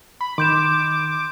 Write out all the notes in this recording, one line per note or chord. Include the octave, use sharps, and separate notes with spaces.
B5
D#3 C6 D6 G6 E7